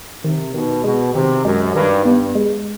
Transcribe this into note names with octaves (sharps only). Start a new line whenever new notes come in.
C3 D#3
B2 D#3
B2 G#3
C3 D#3
F#2 G#3
G2 D#3
G2 B3
G#3